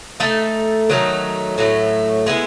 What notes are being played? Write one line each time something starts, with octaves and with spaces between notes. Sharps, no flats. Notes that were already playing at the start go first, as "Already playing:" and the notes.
A3 D#4 A4
D#3 F#3 A3 D#4
A2 F#3 A3
G#3 B3 E4